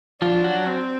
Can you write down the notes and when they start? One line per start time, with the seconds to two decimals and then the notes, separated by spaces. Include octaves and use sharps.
0.22 F3 D4 F4
0.44 F#3 F#4
0.66 C4